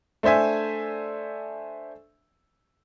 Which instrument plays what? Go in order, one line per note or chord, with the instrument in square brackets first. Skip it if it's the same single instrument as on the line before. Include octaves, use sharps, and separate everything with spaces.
[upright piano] A3 D4 C5 E5 G#5